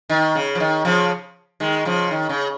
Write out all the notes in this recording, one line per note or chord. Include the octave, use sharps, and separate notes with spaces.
D#3
C#3
F3
D#3
C#3 F3
D#3 G#3
C#3 F3
D#3
C#3